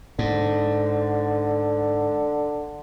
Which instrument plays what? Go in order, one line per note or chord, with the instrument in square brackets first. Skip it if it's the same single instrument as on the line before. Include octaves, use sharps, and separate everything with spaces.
[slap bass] G#2 [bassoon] D3